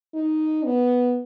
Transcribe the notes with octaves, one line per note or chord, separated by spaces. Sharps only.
D#4
B3